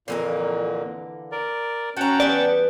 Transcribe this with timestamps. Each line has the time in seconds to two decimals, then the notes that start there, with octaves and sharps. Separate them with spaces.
0.08 F2 A#2 D3 E3 A#3
1.32 A#4 D5
1.97 C#4 F#4 F#5 G5 A5 A#5
2.20 E3 G3 B3 D5